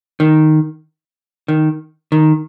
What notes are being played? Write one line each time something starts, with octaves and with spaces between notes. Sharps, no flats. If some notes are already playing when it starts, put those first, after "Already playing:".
D#3
D#3
D#3